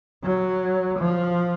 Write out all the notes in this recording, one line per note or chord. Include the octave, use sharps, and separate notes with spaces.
F#3
F3